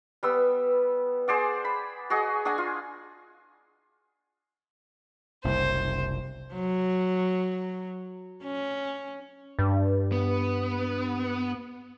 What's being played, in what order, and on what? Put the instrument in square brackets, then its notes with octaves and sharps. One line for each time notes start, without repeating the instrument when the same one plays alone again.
[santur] G3 B3 E6
G#4 C5 D5 F#5
B5
F#4 G#4 D#5
D4 G#4 F#5 G#5
F4
[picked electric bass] F#1 C2 [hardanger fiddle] C5
[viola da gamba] F#3
C#4
[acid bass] G2
[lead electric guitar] B3